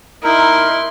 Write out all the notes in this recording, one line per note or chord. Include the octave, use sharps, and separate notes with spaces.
D#4 E4 A#4 C6